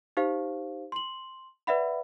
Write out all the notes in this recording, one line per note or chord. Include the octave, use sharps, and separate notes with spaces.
D#4 G4 C5 F5
C6 F#7
B4 D5 E5 F#5 B5